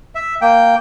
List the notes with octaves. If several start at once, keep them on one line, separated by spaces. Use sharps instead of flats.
E5
A#3 G5